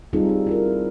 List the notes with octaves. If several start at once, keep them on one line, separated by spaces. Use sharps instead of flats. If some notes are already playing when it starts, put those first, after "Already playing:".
G3 C4 D#4 F4 G#4 A4
D#4
E4 F4 A#4
C4